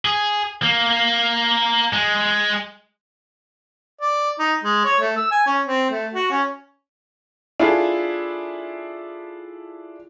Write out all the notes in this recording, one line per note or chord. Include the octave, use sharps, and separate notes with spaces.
G#4
A#3
G#3
D5
D#4
G#3
C#5
A3
E6
G#5
C#4
C4
A3
F#4
C#4
D4 E4 F4 G#4 A4